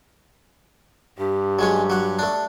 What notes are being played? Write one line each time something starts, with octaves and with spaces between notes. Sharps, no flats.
G2 G4
F#3 G#3 C#4
F#3 F#5
A3 D4